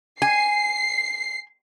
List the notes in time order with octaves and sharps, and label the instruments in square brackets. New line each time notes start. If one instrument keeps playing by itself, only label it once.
[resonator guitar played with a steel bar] G#5 [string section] C7